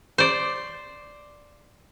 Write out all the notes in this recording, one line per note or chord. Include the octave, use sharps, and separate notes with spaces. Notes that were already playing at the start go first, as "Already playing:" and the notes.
C5 D5